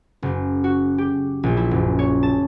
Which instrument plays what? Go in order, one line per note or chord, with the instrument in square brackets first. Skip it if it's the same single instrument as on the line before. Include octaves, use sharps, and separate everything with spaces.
[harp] F#1
F#4
G4
A#1
E4
F#1
C#5
A5